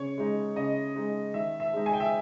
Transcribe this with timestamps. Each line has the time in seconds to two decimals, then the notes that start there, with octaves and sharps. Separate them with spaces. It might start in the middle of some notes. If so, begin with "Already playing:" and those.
Already playing: C#3 C#5
0.17 G#3 D#4
0.56 C#3 D#5
0.95 G#3 D#4
1.34 D#3 E5
1.60 E5
1.73 G#3 D#4
1.86 G#5
1.93 G5
2.00 E5